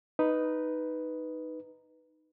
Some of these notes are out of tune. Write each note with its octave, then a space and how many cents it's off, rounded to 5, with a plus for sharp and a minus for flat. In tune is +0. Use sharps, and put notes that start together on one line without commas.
D#4 +0 B4 +0